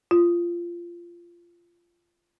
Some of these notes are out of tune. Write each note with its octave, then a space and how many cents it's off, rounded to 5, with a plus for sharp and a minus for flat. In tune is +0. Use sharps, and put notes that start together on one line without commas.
F4 -20